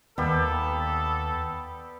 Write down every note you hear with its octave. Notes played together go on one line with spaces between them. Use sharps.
D#2 G3 B3 G4 A4